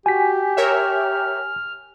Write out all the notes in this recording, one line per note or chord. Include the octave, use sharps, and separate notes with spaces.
F#4 G4 G#5 B6
A#4 C#5 E5 F6